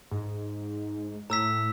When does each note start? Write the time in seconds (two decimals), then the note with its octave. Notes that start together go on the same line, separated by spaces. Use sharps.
0.11 G#2
1.30 A2 A#5 E6 B6